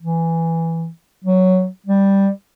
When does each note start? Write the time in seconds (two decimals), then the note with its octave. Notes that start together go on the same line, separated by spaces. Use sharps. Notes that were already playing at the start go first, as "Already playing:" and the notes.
0.02 E3
1.24 F#3
1.86 G3